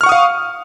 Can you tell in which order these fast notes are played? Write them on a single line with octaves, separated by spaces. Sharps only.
F6 C#6 F#5 D#6 F5